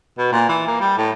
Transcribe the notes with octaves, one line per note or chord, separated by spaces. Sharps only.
B2
A#2
E3
A#3
G3
A2